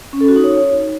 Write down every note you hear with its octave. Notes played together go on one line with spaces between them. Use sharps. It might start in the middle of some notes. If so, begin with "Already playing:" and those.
C#4
A4
F#4
D#4
C#5